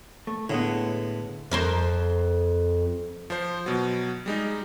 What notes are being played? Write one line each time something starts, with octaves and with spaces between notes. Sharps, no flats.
A3
A2 D3 G#3 B3
F2 A#4 C5
F3 C5
B2 F#3
G3 G#3 D#4